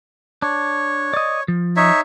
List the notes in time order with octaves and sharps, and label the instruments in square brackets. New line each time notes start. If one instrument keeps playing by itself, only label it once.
[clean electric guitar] D4 [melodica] C#5
[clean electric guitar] D5 D#5
F3
[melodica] D#4 C#5 E5